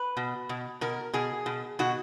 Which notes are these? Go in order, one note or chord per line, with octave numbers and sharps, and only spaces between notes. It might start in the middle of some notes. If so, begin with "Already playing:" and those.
Already playing: B4
B2
B2
B2 A#4
B2 G#4
B2
B2 F#4